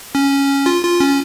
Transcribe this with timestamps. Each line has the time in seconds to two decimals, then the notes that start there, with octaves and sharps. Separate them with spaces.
0.15 C#4
0.66 F4
0.84 F4
1.00 C#4